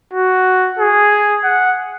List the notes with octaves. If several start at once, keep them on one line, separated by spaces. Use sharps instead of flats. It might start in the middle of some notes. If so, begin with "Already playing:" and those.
F#4
G#4
F#5